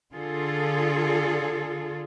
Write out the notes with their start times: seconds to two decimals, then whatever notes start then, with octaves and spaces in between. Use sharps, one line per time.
0.13 D3 F4 G#4 A4